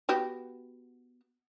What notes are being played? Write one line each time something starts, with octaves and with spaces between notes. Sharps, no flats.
B3 F#4 G4